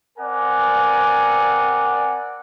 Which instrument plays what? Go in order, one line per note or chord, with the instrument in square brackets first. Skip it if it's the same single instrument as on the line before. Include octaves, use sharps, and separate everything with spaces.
[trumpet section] C4 A#4 D5 F#5 G#5